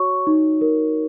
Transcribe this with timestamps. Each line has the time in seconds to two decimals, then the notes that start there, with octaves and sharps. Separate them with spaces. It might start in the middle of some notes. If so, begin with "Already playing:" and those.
Already playing: F#4 C#5 C#6
0.27 D#4
0.61 A#4